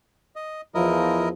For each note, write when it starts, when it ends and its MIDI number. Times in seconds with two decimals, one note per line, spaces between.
0.36 0.61 75
0.74 1.32 40
0.74 1.32 53
0.74 1.29 64
0.74 1.29 70
0.74 1.29 75